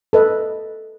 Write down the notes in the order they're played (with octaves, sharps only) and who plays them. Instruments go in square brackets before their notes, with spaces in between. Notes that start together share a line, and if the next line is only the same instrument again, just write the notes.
[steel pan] A4 B4 D#5